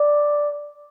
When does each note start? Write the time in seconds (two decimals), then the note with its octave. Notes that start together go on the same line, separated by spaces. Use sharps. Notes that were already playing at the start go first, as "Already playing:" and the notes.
Already playing: D5